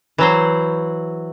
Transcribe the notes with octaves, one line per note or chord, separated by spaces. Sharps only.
E3 F#3 C5